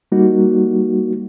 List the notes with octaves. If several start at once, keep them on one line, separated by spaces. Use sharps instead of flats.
G3 A#3 D#4 F#4